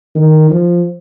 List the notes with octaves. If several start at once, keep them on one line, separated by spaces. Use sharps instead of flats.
D#3
F3